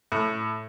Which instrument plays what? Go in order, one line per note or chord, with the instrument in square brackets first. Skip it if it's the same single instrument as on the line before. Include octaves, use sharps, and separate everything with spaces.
[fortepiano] A2